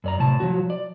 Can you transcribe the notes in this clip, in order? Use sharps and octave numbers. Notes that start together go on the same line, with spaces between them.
F#2 D5 A#5
A2 C3 A5
F3 F#3 G#3 F#4
D5